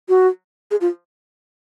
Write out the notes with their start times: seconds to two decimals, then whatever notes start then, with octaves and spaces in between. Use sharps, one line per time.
0.09 F#4
0.71 G#4
0.81 F4